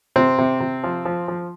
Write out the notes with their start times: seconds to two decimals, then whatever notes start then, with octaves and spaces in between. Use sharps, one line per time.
0.16 C3 C4
0.38 C3
0.60 C3
0.84 F3
1.05 F3
1.28 F3